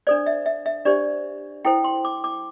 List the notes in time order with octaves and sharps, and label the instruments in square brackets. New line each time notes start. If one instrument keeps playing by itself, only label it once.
[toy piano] D4 A4 C5 D5
E5
E5
E5
D4 G4 C5 D5
E4 A4 C5 G5
C6
D6
D6